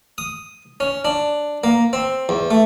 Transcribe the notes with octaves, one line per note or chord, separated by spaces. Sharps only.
D#6
C#4
D4
A#3
C4
E2
A3